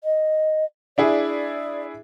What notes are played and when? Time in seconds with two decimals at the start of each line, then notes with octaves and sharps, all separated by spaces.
0.04 D#5
0.98 D4 E4 G#4 D5